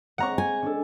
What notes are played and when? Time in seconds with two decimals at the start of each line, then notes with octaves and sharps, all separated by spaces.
0.18 G#3 C4 F#5 A#5 C#6 D6
0.38 G#5
0.62 C#4 D4 A4